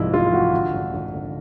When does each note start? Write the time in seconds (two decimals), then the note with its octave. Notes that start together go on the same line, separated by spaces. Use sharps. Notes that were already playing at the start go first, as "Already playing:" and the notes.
Already playing: C2 G#2 F3 E4
0.13 A1 F4
0.33 A1 F#4
0.53 D3
0.74 G#1
0.94 G#1
1.13 D3